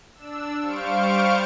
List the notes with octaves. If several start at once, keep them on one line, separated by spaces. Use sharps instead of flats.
D4 E6
G3 C5 F5 C#6 D7